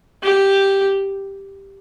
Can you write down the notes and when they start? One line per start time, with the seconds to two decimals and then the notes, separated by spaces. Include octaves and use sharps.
0.23 G4